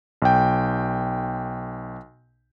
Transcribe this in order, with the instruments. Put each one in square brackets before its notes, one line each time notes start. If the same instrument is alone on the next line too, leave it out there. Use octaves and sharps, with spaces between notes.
[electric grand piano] B1 G5